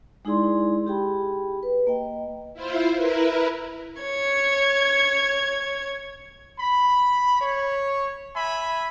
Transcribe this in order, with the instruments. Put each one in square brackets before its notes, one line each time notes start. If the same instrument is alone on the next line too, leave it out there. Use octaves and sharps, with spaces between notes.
[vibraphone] G#3 D#4 E4 G#4 D5 C6
G4 G#4 G5 B5
B4
A#3 D#5 G5
[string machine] E4 F4 C5
E4 A#4 B4
[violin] C#5 G#6
[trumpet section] B5
C#5
E5 G#5 B5